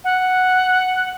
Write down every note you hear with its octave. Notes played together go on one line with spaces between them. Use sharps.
F#5